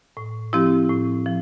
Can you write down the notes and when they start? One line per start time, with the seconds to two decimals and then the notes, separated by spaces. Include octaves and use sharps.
0.17 A2
0.53 F3 C4 E4 G4
0.90 A2
1.26 F3